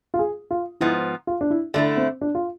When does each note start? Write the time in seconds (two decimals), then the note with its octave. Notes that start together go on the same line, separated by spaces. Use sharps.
0.14 F4
0.19 G#4
0.51 F4
0.81 G#2 F3 B3 E4
1.27 F4
1.41 D4
1.50 E4
1.74 D3 A3 D4 E4
1.97 C4
2.21 D4
2.35 F4